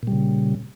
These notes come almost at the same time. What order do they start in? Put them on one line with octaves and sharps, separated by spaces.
A#2 G3 C#3